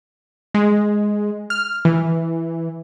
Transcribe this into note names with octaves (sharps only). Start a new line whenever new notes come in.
G#3
F6
E3